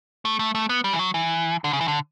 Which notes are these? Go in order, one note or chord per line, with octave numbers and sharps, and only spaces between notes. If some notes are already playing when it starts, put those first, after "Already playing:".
A3
A3
A3
B3
G3
E3
F#3
E3
D3
C#3
E3
D3